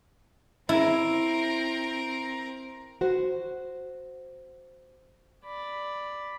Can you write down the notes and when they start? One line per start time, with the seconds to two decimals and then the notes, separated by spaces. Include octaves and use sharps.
0.69 C4 E4 A#4
3.01 F#4 C5
5.45 D5 B5